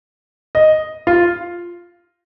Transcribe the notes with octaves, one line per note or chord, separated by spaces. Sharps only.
D#5
F4